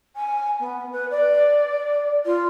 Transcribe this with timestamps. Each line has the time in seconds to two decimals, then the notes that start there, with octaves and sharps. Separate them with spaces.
0.16 G#5
0.60 B3
0.92 B4
1.10 D5
2.25 F4